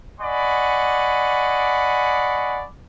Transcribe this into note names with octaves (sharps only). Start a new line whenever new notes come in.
D5 D#5 F#5 G#5 B5 C#6